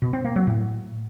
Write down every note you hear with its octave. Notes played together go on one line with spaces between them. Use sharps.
B2
C4
A#3
F#3
A2